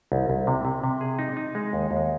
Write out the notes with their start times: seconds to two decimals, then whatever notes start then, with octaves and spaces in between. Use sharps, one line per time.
0.12 C2
0.30 C2
0.47 C3
0.65 C3
0.84 C3
1.01 G#4
1.19 D#4
1.37 D#4
1.55 G#3
1.73 D#2
1.91 D#2